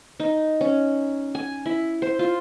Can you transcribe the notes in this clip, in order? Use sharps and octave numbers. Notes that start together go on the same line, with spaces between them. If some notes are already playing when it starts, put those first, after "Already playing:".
D#4
C#4
G#5
E4
C5
F4